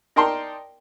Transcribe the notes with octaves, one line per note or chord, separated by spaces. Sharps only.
D#4 A#4 D5 G5 A5 C6